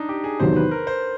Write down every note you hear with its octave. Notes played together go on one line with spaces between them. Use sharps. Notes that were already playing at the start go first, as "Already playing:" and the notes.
Already playing: D4 D#4
G4
G#4
E2 C3 D#3 F#3 B3 C5
B4
A#4
C5